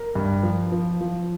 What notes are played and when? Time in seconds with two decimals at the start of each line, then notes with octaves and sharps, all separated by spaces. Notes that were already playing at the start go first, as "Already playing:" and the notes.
Already playing: A#4
0.15 G2
0.43 F3
0.72 F3
1.01 F3